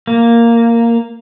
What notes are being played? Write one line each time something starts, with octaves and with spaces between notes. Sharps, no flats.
A#3